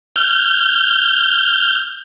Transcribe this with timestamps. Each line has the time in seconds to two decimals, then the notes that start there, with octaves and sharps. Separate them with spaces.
0.16 F6 G6